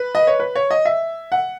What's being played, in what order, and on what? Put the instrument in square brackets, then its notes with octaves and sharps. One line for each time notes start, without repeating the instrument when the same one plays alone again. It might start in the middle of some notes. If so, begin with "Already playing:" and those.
Already playing: [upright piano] B4
D#5
C#5
B4
C#5
D#5
E5
F#5